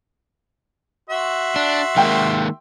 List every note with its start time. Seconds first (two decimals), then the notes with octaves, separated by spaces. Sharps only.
1.10 F#4 E5 C6
1.56 D4
1.96 D#3 G#3 A#3 A#4 G5